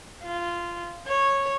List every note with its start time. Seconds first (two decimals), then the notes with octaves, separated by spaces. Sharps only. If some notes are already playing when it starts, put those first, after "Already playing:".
0.23 F4
1.07 C#5